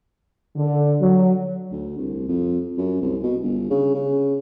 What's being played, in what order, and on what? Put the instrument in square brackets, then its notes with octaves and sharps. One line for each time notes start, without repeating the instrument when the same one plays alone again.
[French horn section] D3
F#3
[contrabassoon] D2
C2
F2
F#2
C2
B2
G1
C#3
C#3